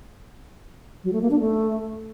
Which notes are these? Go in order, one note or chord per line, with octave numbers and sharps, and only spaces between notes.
F#3
A3
A#3
D4
A3